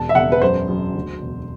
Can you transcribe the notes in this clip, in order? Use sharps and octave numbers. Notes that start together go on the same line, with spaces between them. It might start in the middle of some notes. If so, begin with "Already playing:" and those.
Already playing: E1 A5
E5
E1 F#5
B4
F#2 C5
F#2
D2
E1